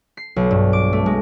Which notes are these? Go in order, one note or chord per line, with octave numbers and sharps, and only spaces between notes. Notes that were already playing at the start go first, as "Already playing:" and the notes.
C7
B1
G2
D6
A3
G#3